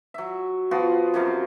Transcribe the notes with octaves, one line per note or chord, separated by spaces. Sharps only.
F#3 E5
F3 B3 F4 F#4
F#2 C3 F#3 F5